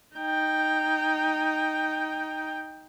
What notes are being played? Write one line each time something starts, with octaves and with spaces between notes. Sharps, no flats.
D#4 G5